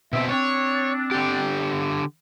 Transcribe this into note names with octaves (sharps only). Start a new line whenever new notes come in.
B2 C4 E5
C4 D4 C#5
D3 G4